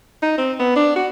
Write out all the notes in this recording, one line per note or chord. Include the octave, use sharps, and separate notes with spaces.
D#4
C4
B3
D4
F#4